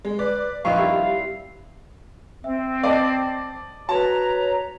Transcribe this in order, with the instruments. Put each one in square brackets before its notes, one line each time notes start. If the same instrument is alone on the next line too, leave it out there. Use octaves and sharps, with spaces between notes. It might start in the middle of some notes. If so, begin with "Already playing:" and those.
[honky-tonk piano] G#3
[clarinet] B4 [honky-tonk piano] D5
[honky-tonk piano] A#1 F3 C#6 [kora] D#3 C4 B4 [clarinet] F5
[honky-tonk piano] G3 [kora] E4
[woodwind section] C4 [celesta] E5
[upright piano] D5 D#5 [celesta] A5 D6
[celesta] F#4 [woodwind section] B4 C#5 A#5 [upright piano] A5